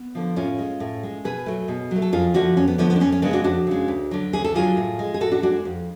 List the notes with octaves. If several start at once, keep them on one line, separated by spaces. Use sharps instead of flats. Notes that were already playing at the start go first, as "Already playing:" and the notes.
Already playing: B3
D3 F3
A2 C#4 F4
G#3
A2
G#3
B2 G#4 B4
F#3 A3
B2
F#3 A3
A4
F2 F4 G#4
D3 F3 A3 D4 F#4
F2 C#4
B3
D3 F3 A3 B3
B3
D4
F2 C#4
C#4
C#3 G#3 B3 D4
D4 F#4
F2 D4 F#4
C#3 G#3
D2
D3 F#3
D2 G#4
A4
D3 F#3 F4 G#4
A2
G#3
G#4
A2 F#4 A4
D4 F#4
G#3 D4 F#4
F2